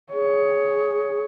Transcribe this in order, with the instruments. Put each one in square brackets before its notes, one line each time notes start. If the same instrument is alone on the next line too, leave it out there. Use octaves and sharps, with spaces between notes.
[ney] G#4 [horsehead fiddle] C#5